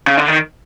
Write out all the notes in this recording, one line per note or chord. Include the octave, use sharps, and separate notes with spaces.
C#3
D3
D#3